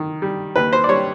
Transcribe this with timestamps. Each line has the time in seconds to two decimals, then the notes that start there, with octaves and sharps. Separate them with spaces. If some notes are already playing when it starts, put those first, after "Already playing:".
Already playing: D#3
0.22 G3
0.56 D#2 B4
0.73 C5
0.84 D5
0.89 G3 C#5